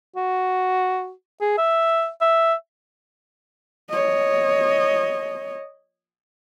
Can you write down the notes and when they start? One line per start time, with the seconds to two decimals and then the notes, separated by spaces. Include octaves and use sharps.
0.16 F#4
1.41 G#4
1.58 E5
2.21 E5
3.90 C#5 D#5